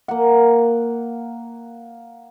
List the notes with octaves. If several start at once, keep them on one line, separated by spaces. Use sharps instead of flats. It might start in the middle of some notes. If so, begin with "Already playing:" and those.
A#3 F#5